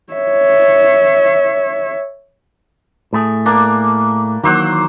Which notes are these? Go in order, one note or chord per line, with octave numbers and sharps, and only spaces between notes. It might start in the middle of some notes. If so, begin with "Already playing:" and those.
C#5 E5
A2 A3 G#4
A#3 D4
D#3 E3 F#3 A#3 C5 F#5